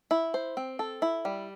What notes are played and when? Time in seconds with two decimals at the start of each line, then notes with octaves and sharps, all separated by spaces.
0.11 E4
0.34 C5
0.57 C4
0.79 A4
1.02 E4
1.25 G3